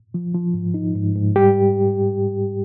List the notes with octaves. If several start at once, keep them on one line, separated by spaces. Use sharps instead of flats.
F3
F3
G#2
D#4
G#2
G#2
G3 G4